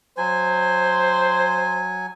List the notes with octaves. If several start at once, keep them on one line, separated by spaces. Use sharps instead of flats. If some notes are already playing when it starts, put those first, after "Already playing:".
F#3 C5 G#5